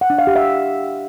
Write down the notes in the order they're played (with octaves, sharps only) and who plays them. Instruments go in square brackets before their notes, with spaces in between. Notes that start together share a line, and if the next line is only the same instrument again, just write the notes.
[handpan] F#5
D4
F5
G4
E5